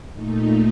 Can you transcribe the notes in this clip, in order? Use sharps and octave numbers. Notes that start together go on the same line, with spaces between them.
A#2 A3 D#4